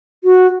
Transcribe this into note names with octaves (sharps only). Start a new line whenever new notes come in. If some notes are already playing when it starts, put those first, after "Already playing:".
F#4